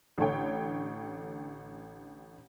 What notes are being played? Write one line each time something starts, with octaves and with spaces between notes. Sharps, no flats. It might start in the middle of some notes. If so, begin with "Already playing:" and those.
A1 D3 A4 C#5 G5